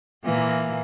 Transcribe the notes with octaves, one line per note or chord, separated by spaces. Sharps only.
A#2 E3 A#3